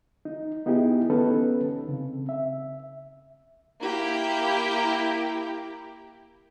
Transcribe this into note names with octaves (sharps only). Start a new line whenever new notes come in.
D#4
B3 D#4 E4 G4 G#4
B3 C#4 D#4 A4 B4
C#3 C4
E5
A#3 E4 G4 G5